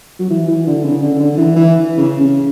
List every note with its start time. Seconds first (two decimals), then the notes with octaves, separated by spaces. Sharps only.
0.20 F#3
0.30 E3
0.48 E3
0.67 D3
0.85 C#3
1.02 D3
1.20 D3
1.37 E3
1.56 E3
1.98 C#3
2.21 C#3